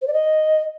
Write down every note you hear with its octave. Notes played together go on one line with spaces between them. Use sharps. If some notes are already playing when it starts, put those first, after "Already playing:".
C5
D5
D#5